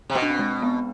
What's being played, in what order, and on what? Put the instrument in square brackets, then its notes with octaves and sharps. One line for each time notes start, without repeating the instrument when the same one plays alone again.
[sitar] C3
[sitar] B2 [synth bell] C4
[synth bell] D4
C4
G#3
B3